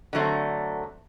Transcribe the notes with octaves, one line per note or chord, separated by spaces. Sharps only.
D3 F#3 A3 C4